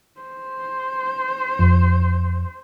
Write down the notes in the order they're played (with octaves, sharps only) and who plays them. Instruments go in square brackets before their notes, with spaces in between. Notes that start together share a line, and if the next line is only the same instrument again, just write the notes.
[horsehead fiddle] C5
[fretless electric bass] F2